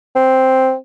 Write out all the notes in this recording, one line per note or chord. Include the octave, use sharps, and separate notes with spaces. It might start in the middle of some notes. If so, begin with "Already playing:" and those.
C4